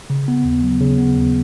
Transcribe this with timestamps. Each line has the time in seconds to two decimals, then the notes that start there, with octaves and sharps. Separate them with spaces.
0.10 C#3
0.28 B3
0.45 D#2
0.63 F#3
0.81 C#3
0.98 B3
1.16 D#2